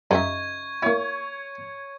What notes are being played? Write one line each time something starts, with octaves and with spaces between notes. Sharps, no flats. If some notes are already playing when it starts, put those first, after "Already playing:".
F#2 C#3 D#4 E5 C#6 G#6
A#3 E4 C#5